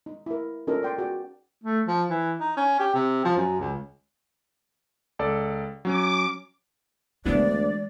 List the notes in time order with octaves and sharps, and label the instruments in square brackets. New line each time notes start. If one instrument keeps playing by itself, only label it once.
[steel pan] D#4
E4 A#4
C#4 D#4 F4 A4 A#4
D5 G5 C6
F#4 G#4 D5 G5
[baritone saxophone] A3
F3
E3
D#4
C#4
G4
C3
F3
F#2
C#2
[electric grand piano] C#2 A4 D5
[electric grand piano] F#3 C#4 [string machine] D6
[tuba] D2 [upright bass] E3 G#3 [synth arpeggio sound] B3 D4 E4 [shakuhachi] D5